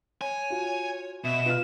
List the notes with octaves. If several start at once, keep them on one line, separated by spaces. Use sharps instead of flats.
C#5 G#5
F4 F#4
B2 E5 E7
F4 B4 F5 F6